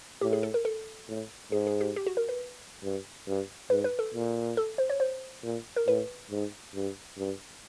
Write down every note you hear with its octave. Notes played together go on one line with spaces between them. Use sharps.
A2 G4
G#4
A4
A#4
A4
A2
G#2 G#4
G#4
G4
G4
F#4
A#4
B4
G2
G2
G#2 B4
B4
A4
A#2
A4
C5
C#5
C5
A#2
A#4
A2 B4
G#2
G2
G2